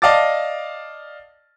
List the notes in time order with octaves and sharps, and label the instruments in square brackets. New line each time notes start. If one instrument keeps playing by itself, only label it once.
[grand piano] D5 D#5 F5 A5 D6 A6